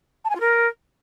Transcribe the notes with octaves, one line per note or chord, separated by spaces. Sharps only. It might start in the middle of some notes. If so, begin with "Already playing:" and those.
A5
G#5
F4
A#4